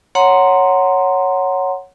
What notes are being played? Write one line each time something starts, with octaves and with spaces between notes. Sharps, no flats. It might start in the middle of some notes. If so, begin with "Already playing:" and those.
C#5 F#5 A#5 C6